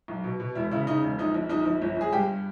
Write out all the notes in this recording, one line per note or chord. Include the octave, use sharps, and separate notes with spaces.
B1
B2
B2
E1 E4
C#3 E4
C#3 D#4
E1
A#1 D#4
A#1
A#1 D#4
A#1
G1
G1 G#4
G2 G4